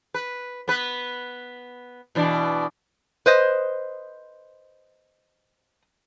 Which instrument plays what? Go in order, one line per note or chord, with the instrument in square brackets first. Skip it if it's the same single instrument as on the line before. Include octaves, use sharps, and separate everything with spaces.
[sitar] B4
B3 B4
B2 E3 D4
[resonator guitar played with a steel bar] B4 C5 D#5